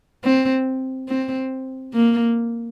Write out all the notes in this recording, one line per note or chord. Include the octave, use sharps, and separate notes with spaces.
C4
C4
A#3